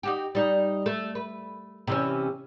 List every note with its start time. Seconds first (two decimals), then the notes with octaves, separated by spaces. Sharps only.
0.03 D#4 F#4 G4
0.35 G3 D#4
0.86 A3
1.15 B4
1.87 C3 E3 C#4